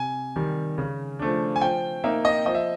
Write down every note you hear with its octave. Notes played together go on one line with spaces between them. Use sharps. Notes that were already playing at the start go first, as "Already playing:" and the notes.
Already playing: C3 G#5
D#3 G3
C#3
F3 A3 D4
G#5
F3 G5
A#3 D#4 E5
D#5
F3 D#5
E5